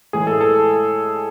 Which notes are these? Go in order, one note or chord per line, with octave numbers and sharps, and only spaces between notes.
A2 E3 G#3 G#4
A4
A4